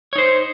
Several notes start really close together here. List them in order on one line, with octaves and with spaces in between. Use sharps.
C#5 D#4 C5